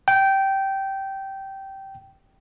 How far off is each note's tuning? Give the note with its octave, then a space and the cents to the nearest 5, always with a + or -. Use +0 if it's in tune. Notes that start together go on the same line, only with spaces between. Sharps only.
G5 -15